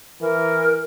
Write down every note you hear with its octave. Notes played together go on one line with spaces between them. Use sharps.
E3 A#4